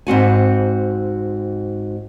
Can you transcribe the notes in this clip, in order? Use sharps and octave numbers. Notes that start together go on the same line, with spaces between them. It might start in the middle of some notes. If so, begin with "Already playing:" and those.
G#2 C4 F#4 G#5